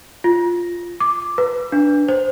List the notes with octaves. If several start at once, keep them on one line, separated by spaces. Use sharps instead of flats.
F4
D6
B4
D4
C5